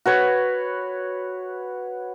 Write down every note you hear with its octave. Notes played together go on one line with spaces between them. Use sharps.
F#4 B4 C#5